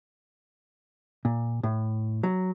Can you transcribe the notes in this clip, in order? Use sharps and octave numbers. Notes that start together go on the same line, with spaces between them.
A#2
A2
F#3